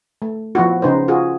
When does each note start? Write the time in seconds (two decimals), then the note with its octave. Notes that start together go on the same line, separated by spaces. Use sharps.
0.22 A3
0.55 F3 B3 E4 F#4
0.82 C#3 D#4 B4 C5
1.08 F4 F#4 G#4